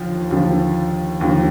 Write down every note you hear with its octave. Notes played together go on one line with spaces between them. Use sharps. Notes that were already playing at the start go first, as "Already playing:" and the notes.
Already playing: D#2 D3 F3
D#2 D3 F3
D#2 D3 F3